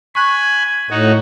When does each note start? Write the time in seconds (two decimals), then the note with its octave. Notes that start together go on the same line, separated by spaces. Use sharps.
0.15 G#5 B5 C#6 F#6
0.91 A2 D#4 F#4